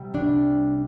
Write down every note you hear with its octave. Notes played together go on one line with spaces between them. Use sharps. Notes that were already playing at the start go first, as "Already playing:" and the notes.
Already playing: C3 G3
C2 D4